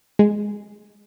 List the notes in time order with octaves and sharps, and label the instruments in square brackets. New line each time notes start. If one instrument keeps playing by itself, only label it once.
[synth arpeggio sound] G#3